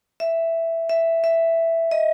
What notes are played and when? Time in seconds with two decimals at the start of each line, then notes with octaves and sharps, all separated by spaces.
0.20 E5
0.89 E5
1.24 E5
1.91 D#5